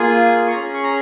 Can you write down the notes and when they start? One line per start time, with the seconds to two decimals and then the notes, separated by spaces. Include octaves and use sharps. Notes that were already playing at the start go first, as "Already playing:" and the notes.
Already playing: A#3 F4 G#4 G#5
0.47 C#6
0.51 C#4 G#4 A#5
0.73 C#6
0.84 A#5